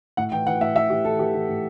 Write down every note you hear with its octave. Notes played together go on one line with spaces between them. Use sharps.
A2 F#5
E3 G5
E3 F#5
A2 E5
E3 E5
E3 G4
E3 A4
E3 G4
E3
A2